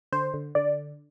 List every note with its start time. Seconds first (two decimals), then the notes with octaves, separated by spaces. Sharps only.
0.13 D3 C5
0.34 D3
0.55 D3 D5